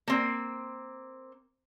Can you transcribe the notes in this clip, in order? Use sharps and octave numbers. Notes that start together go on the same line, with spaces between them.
A#3 C4